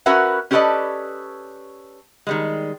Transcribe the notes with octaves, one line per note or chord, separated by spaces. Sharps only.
C#4 F#4 A#4 B4 E5 F#5
C#4 G4 A4 B4 D5 D#5
D#3 G3 G#3